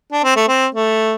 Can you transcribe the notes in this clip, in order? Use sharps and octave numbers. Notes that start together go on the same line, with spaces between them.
D4
C4
A3
C4
A3